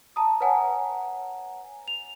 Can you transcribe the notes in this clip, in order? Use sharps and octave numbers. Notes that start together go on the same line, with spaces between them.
A5 A#5 D#6
B4 C#5 F#5 G#5 A#5
F7